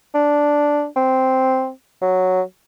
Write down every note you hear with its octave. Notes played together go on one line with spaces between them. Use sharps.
D4
C4
F#3